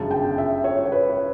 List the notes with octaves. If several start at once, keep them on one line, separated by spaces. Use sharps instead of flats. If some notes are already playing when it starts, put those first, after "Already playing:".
Already playing: G1 F#2 C#3 A5
G5
E5
C#5
C#5
B4